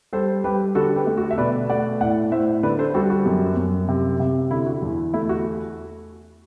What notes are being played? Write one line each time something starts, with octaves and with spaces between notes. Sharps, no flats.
G3 A4 C5
G3 G4 B4
D3 F#4 A4
G4 B4
A3
F#4
E5
B2 B4 D5
A3 D5 F#5
A2 D5 F#5
A2 C5 E5
D3 B4 D5
A4 C5
G3 F#4 A4
F#4
F#2
F#2
C3
C3
D3 E4
F#4
E2
A3 E4
F#4